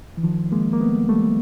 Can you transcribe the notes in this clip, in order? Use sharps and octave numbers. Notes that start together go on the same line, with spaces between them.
E3
D#3 F3
G#3 A#3
A#3
A3 B3
G3 A3